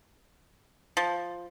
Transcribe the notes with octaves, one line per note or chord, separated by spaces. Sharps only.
F3